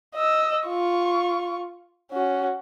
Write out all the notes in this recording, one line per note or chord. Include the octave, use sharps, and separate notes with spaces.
D#5 E6
F4 C#6
C#4 F#4